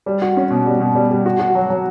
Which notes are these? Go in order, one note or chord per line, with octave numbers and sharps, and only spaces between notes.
G3
F#4
C#4
B2
G3
B2
G3
G3
F#4
F#4
F#3
F#3